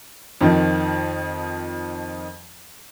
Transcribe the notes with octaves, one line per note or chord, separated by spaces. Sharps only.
F2 D#3 F3